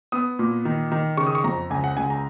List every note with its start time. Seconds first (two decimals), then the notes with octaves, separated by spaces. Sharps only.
0.12 B3 D#6
0.39 A#2
0.65 D#3
0.92 D#3
1.17 C#3 C#6
1.27 D#6
1.35 C#6
1.44 F2 A#5
1.70 C#2 G#5
1.84 F#5
1.97 C#2 G#5
2.10 A#5